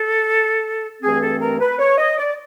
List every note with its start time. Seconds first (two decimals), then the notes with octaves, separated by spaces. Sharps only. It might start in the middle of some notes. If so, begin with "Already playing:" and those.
Already playing: A4
1.02 G2 E3 A3 C4 G#4
1.21 A4
1.40 A#4
1.60 B4
1.79 C#5
1.98 D#5
2.18 D5